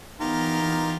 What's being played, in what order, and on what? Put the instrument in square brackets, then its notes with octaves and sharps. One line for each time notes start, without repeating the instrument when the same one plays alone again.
[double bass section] E3 B3 [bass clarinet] D#4 [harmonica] F4 G4 A#4